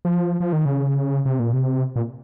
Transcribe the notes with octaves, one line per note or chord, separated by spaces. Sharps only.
F3
F3
D#3
C#3
C3
A#2
C3
A#2